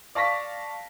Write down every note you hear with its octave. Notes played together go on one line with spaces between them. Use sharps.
D5 F5 A5 C#6 A#6 B6